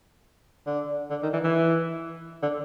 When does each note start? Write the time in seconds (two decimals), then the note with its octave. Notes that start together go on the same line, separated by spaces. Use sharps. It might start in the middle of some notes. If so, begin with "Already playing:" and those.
0.67 D3
1.11 D3
1.23 D#3
1.33 E3
1.44 E3
2.43 D3